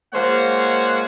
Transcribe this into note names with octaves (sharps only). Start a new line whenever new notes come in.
F3 G#3 A#3 C5 C#5 F#5